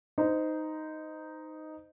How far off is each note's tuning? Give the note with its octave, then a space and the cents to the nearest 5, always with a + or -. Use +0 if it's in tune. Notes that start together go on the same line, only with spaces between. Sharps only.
D#4 +0 C5 -25